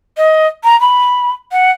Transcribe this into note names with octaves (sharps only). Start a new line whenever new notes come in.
D#5
A#5
B5
F#5